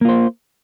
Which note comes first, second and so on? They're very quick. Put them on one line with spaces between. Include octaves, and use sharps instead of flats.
A#3 F4 C5